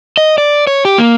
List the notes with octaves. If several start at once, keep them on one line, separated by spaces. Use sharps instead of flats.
D#5
D5
C#5
G4
A#3